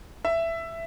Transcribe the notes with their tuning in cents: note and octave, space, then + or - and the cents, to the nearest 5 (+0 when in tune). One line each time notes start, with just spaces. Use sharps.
E5 +10